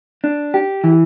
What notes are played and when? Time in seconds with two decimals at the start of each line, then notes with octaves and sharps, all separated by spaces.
0.24 D4
0.54 G4
0.84 E3